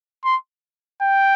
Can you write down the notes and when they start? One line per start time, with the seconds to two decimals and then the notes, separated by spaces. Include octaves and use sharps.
0.24 C6
1.02 G5